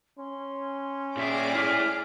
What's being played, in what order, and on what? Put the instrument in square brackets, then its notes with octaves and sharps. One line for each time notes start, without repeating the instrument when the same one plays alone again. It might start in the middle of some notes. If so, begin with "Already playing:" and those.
[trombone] C#4 [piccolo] C6
[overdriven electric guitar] A#2 E5 [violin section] G#4 D5 D6
[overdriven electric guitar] E4 C#5 [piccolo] F6